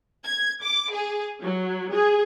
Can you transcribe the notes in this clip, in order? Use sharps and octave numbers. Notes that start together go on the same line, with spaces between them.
G#6
D6
G#4
F#3
G#4